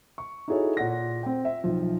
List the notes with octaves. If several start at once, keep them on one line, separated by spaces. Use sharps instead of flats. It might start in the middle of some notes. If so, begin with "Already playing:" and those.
C#6
D#4 E4 F#4 G#4 A4 C#5
A#2 F#5 A#6
C4 G5
E5
B1 F3